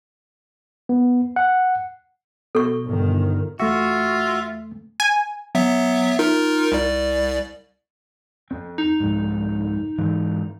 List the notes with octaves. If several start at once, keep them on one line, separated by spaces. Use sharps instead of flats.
B3
F#5
B2 A4 C#6
G1 D#3
E2 A3 F4 F#4 E5
G#5
F#3 B3 E5
D#4 F4 A#4
C2 D5
F2 C4
D#4
C2 F2 G#2
G#2 E3 G#3